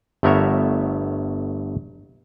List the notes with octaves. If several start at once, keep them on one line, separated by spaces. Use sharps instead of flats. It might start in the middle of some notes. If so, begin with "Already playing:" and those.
G1 A3 B3 A#4 C#5 E5